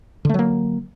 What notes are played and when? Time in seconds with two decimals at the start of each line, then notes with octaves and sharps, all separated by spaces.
0.25 D3
0.29 A3
0.34 F#3
0.39 A#3